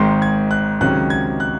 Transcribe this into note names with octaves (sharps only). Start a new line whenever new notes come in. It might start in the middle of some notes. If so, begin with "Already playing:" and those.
Already playing: G#1 G#2 D#3 G#3 C6
G#6
F#6
C#2 C3 D#3 F#3 C#4 F#6
G#6
F#6